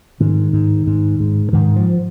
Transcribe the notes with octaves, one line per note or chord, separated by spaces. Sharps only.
G#2 D#3
G#2
G#2
G#2
G#2 D#3
F3